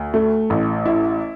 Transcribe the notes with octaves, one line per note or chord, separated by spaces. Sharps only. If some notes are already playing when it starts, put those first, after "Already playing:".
Already playing: D2
A3
A1
E4